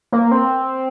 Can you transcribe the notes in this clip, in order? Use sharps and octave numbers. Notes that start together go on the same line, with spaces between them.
A#3
C4